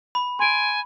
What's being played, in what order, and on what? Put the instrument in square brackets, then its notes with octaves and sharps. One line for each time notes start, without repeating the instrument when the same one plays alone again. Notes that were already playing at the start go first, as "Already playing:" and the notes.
[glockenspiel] B5
[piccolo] G#5 [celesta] C6 D7